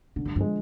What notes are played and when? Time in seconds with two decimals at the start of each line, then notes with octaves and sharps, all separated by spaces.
0.16 B2 D3
0.25 G2
0.36 G2 F3 G#3